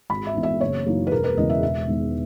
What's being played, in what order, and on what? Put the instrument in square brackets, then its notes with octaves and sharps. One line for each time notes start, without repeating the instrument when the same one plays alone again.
[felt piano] G#1 B5
E5
G#2 E3 B3
E5
F#1 C#5
F#2 E3 A#3 D#4
B4
E1 A#4
B4
E2 C#3 E3 G#3 D#5
E5
E1 E5
E2 D#3 G#3 B3